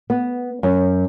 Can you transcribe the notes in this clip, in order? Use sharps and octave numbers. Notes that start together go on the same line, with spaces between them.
B3
F#2